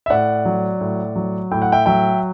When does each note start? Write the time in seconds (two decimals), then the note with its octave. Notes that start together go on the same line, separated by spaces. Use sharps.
0.06 E5
0.10 A2 D5 F#5
0.45 F#3
0.81 A2
1.16 F#3
1.51 A2 G5
1.62 F#5
1.72 E5 G5
1.86 F#3 E5 G5